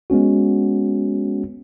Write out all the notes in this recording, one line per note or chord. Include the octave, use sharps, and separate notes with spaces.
G#3 B3 C#4 F#4